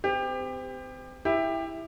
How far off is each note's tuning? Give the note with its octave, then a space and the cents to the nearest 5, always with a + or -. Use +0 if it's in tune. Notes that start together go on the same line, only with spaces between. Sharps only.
C4 -35 G4 +25
E4 +0 G4 +20